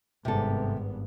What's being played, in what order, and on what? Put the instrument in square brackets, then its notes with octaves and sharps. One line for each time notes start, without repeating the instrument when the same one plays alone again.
[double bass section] G#1 G2 B3 [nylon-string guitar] C3 A4